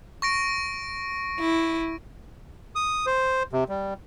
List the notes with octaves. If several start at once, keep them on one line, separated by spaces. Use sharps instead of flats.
C#6 A#6 D7
E4
D#6
C5
C3
G3